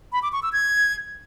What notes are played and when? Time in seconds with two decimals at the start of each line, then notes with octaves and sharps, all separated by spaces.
0.13 B5
0.23 D6
0.33 C#6
0.43 E6
0.53 G#6